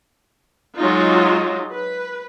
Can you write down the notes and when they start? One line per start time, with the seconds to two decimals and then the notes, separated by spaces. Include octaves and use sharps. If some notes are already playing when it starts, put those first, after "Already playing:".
0.78 F#3 G#3 D#4 F4
1.73 B4